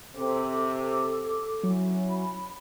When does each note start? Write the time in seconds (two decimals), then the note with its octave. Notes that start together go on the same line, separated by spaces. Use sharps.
0.16 C3 C4 A4 D6
1.63 F#3 C#4 E4 F#4
2.09 B5